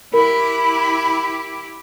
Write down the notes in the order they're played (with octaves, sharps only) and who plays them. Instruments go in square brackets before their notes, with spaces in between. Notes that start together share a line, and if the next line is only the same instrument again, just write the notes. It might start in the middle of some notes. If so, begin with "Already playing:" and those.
[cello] E4 G4 [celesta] A#4 [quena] B5